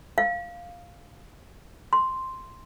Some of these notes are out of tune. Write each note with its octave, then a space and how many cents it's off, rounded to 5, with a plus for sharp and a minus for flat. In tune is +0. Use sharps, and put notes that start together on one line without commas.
F5 +0
C6 +0